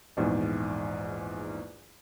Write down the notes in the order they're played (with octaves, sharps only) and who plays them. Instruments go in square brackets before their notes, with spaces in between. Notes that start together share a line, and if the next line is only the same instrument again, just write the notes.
[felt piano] A#1 E2 G#2